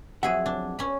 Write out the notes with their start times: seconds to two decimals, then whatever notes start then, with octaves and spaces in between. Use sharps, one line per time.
0.23 F2 F#3 G#4 E5 F#5
0.46 D4
0.79 C#4 B5